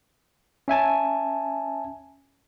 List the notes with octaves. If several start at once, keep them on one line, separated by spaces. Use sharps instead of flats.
C#4 E5 G#5 A5